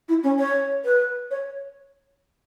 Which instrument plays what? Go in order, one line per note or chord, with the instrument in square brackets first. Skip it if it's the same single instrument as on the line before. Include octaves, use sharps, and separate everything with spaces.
[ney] E4
C#4
C#5
B4
C#5